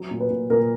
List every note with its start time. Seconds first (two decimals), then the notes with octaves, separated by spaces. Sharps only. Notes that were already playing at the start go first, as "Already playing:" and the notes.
Already playing: F#3
0.11 A#2
0.20 B4
0.30 A#2
0.50 A#2 A#4